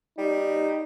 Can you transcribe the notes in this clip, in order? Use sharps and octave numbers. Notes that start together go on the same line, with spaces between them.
G3 D#4